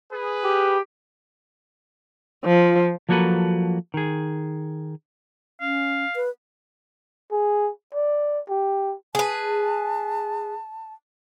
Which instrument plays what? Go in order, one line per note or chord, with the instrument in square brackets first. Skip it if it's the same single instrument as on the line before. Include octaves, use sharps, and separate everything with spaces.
[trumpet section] G#4 B4
[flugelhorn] G4
[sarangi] F3 [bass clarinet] F4
[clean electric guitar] F3 F#3 A#3 F#4 A4 B4
D#3 G#4
[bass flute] C#4 [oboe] F5
[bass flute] B4
[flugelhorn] G#4
D5
G4
[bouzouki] G#4 B4 [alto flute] A5